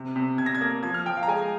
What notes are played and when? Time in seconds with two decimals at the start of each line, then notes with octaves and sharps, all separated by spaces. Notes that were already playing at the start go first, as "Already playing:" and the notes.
Already playing: C3
0.16 C3
0.38 C3 G#6
0.46 A#6
0.55 G#6
0.61 A#3
0.83 F3 G#6
0.94 F6
1.05 F3 G5
1.17 F5
1.23 A#5
1.28 G#3 G#5